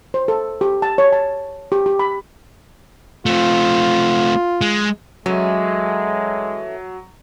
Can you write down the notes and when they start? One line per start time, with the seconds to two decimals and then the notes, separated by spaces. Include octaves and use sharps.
0.14 C5
0.28 A4
0.61 G4
0.82 A5
0.98 C#5
1.12 A5
1.72 G4
1.86 G4
1.99 B5
3.26 A3 C4 F4
4.61 G#3
5.26 E3 F#3 G#3 A3 C#4